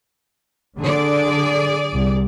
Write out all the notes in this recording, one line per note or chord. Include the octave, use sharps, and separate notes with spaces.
D3 G#4 D5
C2